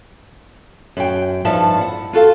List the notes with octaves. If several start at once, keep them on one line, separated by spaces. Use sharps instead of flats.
F#2 G5
G2 F3 D#4 E5 A5
E4 F#5
F4 F#4 A4 F5